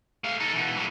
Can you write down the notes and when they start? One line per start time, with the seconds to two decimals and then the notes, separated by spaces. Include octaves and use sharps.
0.24 A3 F5
0.40 D#4 A4
0.54 B2 E3
0.76 A2 F#3